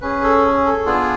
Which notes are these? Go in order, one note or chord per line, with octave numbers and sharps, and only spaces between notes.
C#4 G#4 B4
A4
A4
B3 D4 F4 G#4